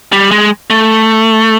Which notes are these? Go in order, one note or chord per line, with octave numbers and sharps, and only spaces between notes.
G3
G#3
A3